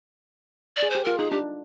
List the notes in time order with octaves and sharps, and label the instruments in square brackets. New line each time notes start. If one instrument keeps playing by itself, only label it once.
[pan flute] D5
[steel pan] G#4
[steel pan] G4 [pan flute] C5
[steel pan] F4 [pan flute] A#4
[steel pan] D#4 [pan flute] G#4
[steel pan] D4 [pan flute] G4